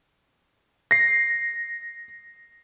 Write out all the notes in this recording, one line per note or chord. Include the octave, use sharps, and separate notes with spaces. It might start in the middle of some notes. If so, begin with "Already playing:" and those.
A#6 C7